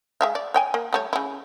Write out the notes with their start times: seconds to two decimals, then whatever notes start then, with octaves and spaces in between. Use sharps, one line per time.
0.21 G#3 E5 F5
0.35 D5
0.54 C#5 G5 G#5
0.74 A#3
0.93 G3 A3 C#5
1.13 C#3 E4